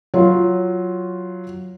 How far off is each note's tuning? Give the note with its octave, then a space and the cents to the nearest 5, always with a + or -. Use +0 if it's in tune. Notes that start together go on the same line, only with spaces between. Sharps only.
F#3 +0 F4 +0 C#5 +0